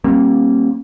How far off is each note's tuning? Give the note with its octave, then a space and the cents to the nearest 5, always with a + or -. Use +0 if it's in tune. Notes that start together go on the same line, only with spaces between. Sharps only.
G3 -25 A#3 +0 C#4 -45